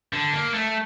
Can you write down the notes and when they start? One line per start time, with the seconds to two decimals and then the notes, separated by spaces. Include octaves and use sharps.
0.13 D3
0.33 A#3
0.54 A3